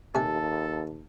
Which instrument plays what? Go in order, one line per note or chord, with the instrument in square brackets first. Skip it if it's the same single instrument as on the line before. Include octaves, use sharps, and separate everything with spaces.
[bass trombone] D#2 [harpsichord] C3 G#5 [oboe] A4 [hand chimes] A5